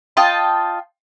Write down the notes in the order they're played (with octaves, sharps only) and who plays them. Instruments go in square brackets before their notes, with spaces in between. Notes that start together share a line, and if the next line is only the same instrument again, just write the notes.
[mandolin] F4 D#5 G5 A5